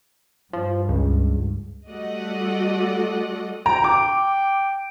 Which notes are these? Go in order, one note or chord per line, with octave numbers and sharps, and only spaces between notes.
G2 F3
C#2
G3 A3 F#4 D5 D#5 F#5
G5 A#5
D6